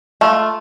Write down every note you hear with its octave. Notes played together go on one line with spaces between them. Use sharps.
A3 F4